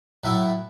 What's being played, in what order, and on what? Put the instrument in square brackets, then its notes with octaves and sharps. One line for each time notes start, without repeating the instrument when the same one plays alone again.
[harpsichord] A2 F#3 A3 E4